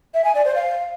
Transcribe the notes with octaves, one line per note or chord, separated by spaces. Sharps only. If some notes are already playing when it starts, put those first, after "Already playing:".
E5
G#5
D5
C5
F5